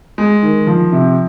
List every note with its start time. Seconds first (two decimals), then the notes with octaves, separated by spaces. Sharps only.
0.18 G#3
0.42 D#3
0.67 F3
0.92 C3